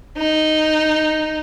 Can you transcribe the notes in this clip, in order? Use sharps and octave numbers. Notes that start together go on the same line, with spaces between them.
D#4